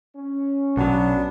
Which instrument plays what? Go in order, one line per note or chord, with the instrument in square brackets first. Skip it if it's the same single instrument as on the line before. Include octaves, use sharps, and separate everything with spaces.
[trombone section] C#4
[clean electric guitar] B1 F#3 [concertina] B3 D4